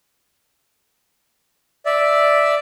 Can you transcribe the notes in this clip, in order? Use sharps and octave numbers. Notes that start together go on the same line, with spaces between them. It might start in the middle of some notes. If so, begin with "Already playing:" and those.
D5 E5